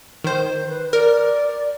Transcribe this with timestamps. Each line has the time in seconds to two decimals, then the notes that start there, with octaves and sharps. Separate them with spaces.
0.24 D#3 C5
0.69 B4
0.93 A#4 D5